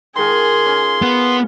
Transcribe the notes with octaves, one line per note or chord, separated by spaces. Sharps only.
D#3 G#3 F4 G#4 C6
C#4
B3